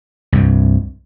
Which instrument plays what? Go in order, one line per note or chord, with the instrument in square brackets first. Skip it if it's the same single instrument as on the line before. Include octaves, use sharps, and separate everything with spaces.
[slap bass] C2 G2